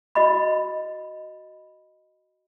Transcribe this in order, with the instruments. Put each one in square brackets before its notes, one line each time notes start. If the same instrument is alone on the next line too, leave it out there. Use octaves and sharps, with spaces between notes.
[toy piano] F#4 D#5 B5